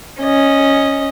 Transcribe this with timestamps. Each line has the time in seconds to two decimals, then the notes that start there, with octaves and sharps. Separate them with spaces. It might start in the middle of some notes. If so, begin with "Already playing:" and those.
0.21 C#4 D#5